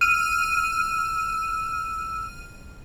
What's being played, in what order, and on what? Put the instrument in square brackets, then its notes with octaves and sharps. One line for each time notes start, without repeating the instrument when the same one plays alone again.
[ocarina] E6 [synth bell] F6 D#7